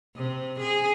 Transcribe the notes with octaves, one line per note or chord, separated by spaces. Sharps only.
C3
G#4